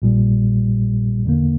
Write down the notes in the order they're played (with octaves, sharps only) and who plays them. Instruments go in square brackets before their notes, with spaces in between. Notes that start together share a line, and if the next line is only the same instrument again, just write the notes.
[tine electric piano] A#1 A#2 G3
E2 D3 A#3